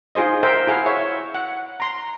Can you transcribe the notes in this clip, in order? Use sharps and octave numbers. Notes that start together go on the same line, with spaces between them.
D#4 F4 G#4 C5 D#5
A#4 C5 E5 G5
E4 G#4 F5 F#5
C#5 E5
F#5
A#5 C6